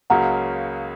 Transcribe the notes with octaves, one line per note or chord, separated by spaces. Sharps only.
C#2 C#3 F#3 A#3 F#5 A#5